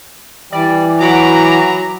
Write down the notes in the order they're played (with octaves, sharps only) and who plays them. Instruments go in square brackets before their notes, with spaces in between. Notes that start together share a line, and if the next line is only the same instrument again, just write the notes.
[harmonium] E3 [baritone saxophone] G3 [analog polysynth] D5
[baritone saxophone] F#3 [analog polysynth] F#4 B5 D6 [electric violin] A#5